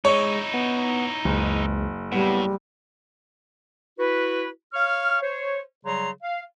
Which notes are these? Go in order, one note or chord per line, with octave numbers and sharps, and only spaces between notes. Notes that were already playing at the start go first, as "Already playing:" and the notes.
G#3 D#4 E4 C#5
B3
F#1 C#2
A2 G3 B3
E4 F#4 B4
C#5 F5 C#6 F6
C5 C#5
C#3 F#3 G3 C#5 A#5 C6
F5